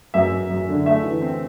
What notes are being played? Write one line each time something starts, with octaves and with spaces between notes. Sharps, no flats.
F#2 E5
F#2
F#2
D3
A3 E5
E3
C4